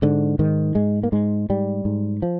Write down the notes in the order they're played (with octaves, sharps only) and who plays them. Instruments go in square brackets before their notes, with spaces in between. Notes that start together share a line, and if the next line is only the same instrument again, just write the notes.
[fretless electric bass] G#2 D3
G#2 D#3
G#2 G#3
A#3
G#2 G#3
G#2 G3
G#2
F3